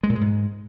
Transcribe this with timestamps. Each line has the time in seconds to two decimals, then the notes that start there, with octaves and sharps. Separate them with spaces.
0.03 G#3
0.09 A#2
0.15 G#3
0.21 G#2